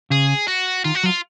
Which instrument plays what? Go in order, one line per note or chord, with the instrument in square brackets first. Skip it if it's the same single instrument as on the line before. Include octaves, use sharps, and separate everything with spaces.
[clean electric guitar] C#3 [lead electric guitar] G#4
[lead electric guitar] F#4
[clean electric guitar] D#3 [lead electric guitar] F4
[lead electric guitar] F#4
[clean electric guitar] F#3 [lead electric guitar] F4